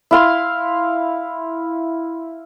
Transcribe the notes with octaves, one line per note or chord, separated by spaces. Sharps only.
E4 F5 C6